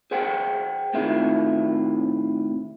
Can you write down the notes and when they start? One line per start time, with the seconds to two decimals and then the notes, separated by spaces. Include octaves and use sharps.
0.11 G#4 B4 C5 F#5 G5
0.93 A2 C3 D#3 E4 F4